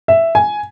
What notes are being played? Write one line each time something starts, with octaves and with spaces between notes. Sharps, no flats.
E5
G#5